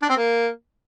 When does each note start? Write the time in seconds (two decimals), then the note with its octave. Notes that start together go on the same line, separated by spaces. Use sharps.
0.02 D4
0.09 C4
0.17 A#3